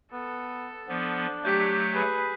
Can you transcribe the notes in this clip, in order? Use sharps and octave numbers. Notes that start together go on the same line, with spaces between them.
B3 A4
F3 B3 D4
F#3 A3 G4 G6 B6
G#4 B4